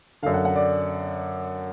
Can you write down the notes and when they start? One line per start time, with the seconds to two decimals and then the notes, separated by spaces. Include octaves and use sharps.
0.23 D3 F5
0.26 F#2
0.34 F#5
0.45 F#5
0.56 D5